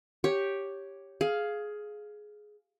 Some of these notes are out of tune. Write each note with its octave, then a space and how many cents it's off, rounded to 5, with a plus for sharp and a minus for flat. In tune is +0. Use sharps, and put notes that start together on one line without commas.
G4 +0 C#5 +0
G#4 +15 F5 +0